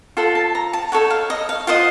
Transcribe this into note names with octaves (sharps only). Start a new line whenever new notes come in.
F4 A4 C5 F#5
A5
A#5
A5
D#4 A4 C#5 F#5
F5
D#5
F5
F4 C5 D#5 F#5